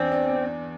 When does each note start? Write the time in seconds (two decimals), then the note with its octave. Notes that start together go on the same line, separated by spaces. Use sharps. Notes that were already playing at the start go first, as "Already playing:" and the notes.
Already playing: E2 C4 D4
0.12 D4